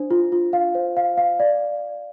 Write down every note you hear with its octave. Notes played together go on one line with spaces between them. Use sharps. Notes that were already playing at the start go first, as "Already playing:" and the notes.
Already playing: D4 C5
F4
F4
F5
C5
F5
F5
D5